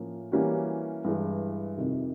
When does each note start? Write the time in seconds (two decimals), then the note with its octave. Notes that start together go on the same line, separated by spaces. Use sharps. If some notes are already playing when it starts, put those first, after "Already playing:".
Already playing: A2 F3 A#3 C#4
0.32 E3 G3 A#3 C#4 F#4
1.04 G2 E3 G#3
1.77 F2 C3 D#3